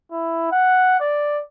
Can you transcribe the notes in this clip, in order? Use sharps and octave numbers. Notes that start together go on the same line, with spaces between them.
E4
F#5
D5